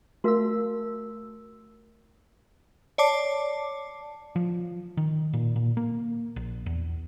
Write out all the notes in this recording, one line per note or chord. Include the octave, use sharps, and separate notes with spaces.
A3 F#4 A#4 F5 E6
C#5 D5 A5 D6 C7
F3
D#3
A#2
A#2
A#3
A#1
E2